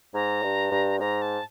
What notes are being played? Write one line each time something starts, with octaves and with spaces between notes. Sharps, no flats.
G#2 A#5
G2
G2
G#2 A#5
A5